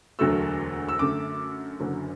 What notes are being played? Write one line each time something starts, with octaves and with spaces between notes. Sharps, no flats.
E1 D2 D3 F#3 A3 E6
E6
F#2 D3 A3 D6
F#1 F#2 D3 F#3